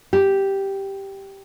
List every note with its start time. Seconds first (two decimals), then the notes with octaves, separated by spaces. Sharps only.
0.13 G4